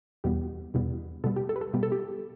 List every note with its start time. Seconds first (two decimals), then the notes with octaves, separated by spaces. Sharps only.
0.24 E2 B2 G3 B3 G4
0.74 E2 B2 G3 B3
1.24 B2 G3 B3 A4
1.36 G4
1.49 A4
1.56 B4
1.61 A4
1.73 B2 G3 B3 G4
1.83 A4
1.92 G4